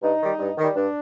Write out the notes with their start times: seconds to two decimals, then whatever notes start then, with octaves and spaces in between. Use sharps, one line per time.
0.02 G2 D#4
0.21 D#3 G3
0.39 G2
0.58 D#3 G3
0.76 G2 D4